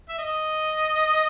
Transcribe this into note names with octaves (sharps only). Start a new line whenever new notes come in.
E5
D#5